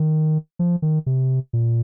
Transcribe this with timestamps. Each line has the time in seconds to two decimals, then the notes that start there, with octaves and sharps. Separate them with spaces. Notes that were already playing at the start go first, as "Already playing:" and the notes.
Already playing: D#3
0.59 F3
0.82 D#3
1.06 C3
1.53 A#2